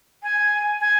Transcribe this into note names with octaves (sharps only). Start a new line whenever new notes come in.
G#5
G#5